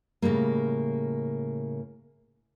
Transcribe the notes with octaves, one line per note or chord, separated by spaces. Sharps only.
A2 C#3 G3 G#3 A#3